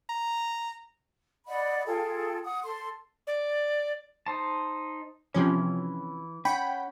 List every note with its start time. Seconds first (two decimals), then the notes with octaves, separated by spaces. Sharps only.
0.09 A#5
1.48 D5 D#5 F#5 B5
1.87 F4 G#4 A4 G5
2.44 F#5 D#6
2.63 A4 C6
3.27 D5
4.26 D#4 C5 A5
5.34 C3 E3 F3 C#4
6.45 C#4 F#5 G5 B5